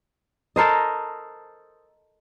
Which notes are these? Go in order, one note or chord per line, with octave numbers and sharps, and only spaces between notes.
A4 A#4 C5 D#5